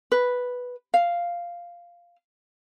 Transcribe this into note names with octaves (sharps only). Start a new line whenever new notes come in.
B4
F5